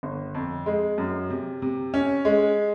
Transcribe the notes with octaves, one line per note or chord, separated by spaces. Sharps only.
G1
F2
G#3
F#2
C3
C3
C#4
G#3